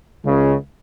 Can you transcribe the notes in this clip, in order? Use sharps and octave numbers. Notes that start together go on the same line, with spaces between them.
C#2 C#3